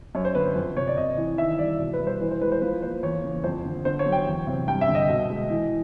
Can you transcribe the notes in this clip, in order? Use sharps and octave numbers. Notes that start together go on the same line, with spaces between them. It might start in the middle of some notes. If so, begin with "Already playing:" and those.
F#2 C#5
C5
D3 B4
C5
F2
C3 C#5
D5
C3 D#5
E3
D#3 E5
G3 D5
B2
B4
G3
C5
E3 B4
C5
G#3 B4
C5
F3 B4
A#3 C5
E2 C#5
C#3
F2 C5
D3
D3 C5
C#5
F#3
G5
E2
C3
G2 G5
E5
D3
D#5
B2
G#3
E3